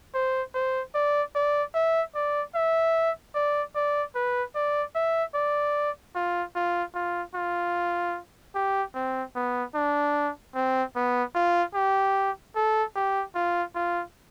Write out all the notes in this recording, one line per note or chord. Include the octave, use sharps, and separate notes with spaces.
C5
C5
D5
D5
E5
D5
E5
D5
D5
B4
D5
E5
D5
F4
F4
F4
F4
G4
C4
B3
D4
C4
B3
F4
G4
A4
G4
F4
F4